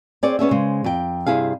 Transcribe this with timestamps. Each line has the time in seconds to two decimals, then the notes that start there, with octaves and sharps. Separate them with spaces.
0.23 C4 G#4 C#5 D5
0.39 B3 C#4 G#4 E5
0.51 C#3 G#3 C5
0.84 F2 G5
1.26 G2 C3 E4 G#4 F5